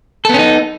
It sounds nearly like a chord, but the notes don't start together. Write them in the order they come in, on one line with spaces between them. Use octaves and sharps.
A4 B3 C#4 D#4